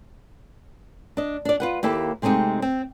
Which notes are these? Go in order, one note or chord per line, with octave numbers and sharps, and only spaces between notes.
D4 D#5
D4 D5
F4 B4 F#5
D#2 A#3 E4 G4 A4
C3 G#3 A3 C4 D#4 G4
C4